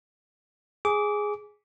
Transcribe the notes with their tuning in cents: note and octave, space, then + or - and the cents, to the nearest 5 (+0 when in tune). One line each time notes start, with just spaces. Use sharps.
G#4 +0 D6 -20